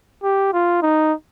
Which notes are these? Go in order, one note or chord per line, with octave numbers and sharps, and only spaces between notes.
G4
F4
D#4